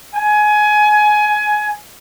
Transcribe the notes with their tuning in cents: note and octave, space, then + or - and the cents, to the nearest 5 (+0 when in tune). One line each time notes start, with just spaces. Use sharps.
G#5 +20